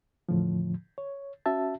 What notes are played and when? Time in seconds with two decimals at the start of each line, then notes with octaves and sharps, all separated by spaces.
0.29 E2 A2 D3 F3
0.98 C#5
1.46 C#4 F#4 E5 A5